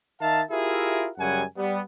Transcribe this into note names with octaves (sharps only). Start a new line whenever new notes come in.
D#3 D#4 E5 F5 A5
E4 F4 G4 G#4 A#4 E5
F#2 C#3 G3 F#5 G#5
G3 B3